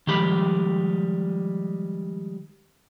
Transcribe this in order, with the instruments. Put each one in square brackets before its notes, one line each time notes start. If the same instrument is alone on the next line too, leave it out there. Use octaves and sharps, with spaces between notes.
[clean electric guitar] D#3 F3 G3 G#3 G4 B5